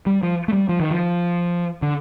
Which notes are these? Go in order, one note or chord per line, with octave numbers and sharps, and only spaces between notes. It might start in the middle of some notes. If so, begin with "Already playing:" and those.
G3
F3
A3
G3
F3
D#3
F3
D3